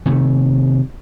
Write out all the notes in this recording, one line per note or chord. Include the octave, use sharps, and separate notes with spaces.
C3 D#3 A3